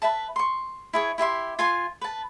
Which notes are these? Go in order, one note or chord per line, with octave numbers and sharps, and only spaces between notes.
B4 E5 A5
C6 C#6
E4 G#4 C#5
E4 G4 E5 C6
F4 G#5 C6
B4 A5